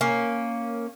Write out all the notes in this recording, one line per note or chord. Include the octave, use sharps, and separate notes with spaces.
A#3 C#4